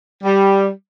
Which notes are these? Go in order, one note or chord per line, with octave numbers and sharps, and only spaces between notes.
G3